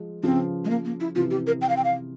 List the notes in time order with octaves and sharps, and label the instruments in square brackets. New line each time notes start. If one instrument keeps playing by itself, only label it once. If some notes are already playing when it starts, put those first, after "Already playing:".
Already playing: [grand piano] F3 G#3
[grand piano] C#3 F3 [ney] C4
[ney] G#3
A#3
A#3
E4
[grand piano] C3 E3 [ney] F4
[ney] G4
A#4
G5
F5
G5
F5